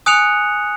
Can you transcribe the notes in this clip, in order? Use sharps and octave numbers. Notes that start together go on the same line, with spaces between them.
G#5 D#6 F#6 C#7 F7